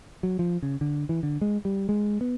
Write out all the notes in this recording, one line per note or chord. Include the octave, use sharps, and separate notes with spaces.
F#3
F3
C#3
D3
E3
D3
G#3
G3
G#3
B3